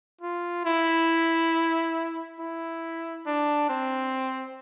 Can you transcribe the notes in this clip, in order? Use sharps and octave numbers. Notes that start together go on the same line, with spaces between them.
F4
E4
E4
D4
C4